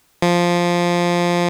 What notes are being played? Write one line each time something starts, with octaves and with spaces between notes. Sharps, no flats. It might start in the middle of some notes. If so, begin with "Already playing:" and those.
F3